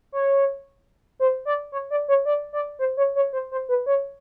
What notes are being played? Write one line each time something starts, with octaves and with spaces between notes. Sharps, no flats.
C#5
C5
D5
C#5
D5
C#5
D5
D5
C5
C#5
C#5
C5
C5
B4
C#5